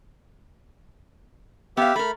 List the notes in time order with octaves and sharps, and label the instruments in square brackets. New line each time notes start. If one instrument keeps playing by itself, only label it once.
[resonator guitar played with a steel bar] B3 F5 [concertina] G4 E5
[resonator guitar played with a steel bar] A3 A#4 [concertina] B5